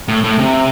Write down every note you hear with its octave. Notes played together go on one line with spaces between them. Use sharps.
A2
A2
C3